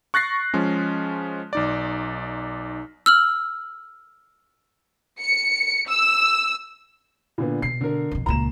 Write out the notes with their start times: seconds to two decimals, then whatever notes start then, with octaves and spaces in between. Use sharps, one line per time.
0.14 C#6 F#6 A6 A#6 C7
0.54 F3 G#3 C#4
1.53 B1 D#4 D5
3.06 E6 F6 F#7
5.21 C#7
5.88 E6
7.38 A#2 D3 B3
7.62 B2 C7
7.81 D3 A#4
8.11 F2 B2
8.26 C#2 A#2 A#5 E7